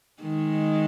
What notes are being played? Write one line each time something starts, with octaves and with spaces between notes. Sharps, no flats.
D#3 G#3